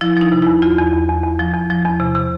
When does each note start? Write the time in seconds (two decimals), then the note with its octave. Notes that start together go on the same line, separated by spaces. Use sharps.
0.01 F3 E4
0.17 F3 D#4
0.32 C3
0.42 E4
0.47 E2
0.62 E2 F4
0.78 E2
0.93 E2
1.09 E2
1.23 E2
1.39 F3
1.54 E2
1.70 F3
1.85 E2
2.00 C3
2.15 C3